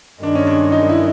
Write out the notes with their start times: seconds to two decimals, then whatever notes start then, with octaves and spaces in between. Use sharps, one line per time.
0.22 G2 D#3 G#3 D4
0.35 C#4
0.47 D4
0.72 D#4
0.89 E4